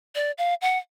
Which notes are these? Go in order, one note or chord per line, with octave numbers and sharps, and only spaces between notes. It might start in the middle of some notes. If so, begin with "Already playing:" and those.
D5
F5
F#5